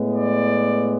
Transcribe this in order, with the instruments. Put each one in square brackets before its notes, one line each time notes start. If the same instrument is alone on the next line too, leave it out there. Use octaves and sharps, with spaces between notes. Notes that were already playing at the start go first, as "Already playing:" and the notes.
Already playing: [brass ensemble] A2 G#3 B3
D5